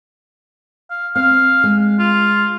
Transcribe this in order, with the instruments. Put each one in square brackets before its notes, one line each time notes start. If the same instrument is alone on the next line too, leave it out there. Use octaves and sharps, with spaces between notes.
[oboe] F5
[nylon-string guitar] C4 [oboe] F5
[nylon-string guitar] G#3
[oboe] F4